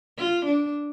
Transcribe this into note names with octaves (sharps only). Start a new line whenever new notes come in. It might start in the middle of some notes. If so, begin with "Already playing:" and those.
F4
D4